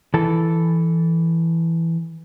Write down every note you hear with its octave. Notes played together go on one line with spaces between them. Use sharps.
E3 A4